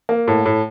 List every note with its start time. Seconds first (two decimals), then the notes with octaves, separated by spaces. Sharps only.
0.09 A#3
0.28 A2
0.46 A2